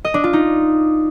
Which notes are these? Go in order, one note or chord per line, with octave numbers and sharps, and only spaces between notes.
D#5
D4
F4
D#4